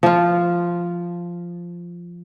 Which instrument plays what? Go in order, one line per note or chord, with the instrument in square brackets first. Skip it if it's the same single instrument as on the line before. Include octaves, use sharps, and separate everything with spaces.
[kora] F3 F4